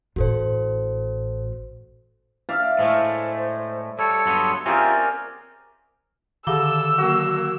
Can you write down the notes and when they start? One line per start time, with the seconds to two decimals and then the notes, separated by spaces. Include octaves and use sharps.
0.16 A1 A2 F#4 A4 C5
2.49 D5 E5 F5
2.79 A2 G#3 A3 C5
3.99 G3 A4 C#5
4.26 G2 F#3 B3 C6
4.66 C4 C#4 F4 G4 G#4 A#4 D5 E5
6.47 D3 D#3 A4 D6 E6
6.98 F#3 A#3 F#4